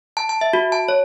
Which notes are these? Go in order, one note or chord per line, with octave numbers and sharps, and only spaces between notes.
A5
A5
E5
F#4
A5
C#5